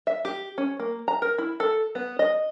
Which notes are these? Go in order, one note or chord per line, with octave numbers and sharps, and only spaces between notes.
E5
G4
C#4
A#3
A#5
A#4
E4
A4
B3
D#5